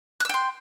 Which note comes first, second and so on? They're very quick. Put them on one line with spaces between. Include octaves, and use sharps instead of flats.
F#6 E6 G5 C6